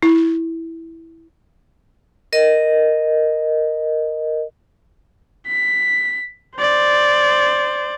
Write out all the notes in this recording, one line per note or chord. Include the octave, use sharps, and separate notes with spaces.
E4
A#4 D#5
B6
C5 D5